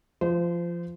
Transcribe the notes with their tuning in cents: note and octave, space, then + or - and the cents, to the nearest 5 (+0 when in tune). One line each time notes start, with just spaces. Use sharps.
F3 -15 C5 -30